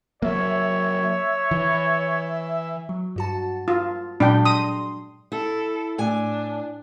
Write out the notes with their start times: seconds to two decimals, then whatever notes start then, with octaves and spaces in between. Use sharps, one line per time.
0.22 F#3 A#3 C#5 E5
1.51 E3
2.89 F#3
3.16 G2 F#4 A5
3.68 F4
4.20 A#2 F#3 G#3 D4 G5
4.45 C6 D#6
5.32 E4 A4
5.98 A2 D4 G#5